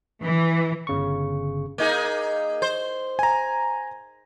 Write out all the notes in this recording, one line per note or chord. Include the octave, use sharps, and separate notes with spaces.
E3
G1 C#3 C#6
A#3 D#4 G#4
C5
G#5 A#5